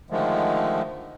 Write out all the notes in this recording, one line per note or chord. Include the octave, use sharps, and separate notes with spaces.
D3 D#3 F3 G#3 A3